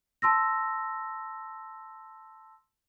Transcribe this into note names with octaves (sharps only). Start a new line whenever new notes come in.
A5 C6 E6 A#6